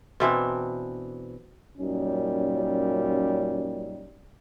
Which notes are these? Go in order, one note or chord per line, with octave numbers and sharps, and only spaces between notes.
B2 E3 C4 D4
F#2 A#2 G3 C#4 D#4